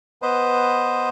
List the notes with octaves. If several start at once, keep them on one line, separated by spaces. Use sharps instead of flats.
B3 B4 C5 D#5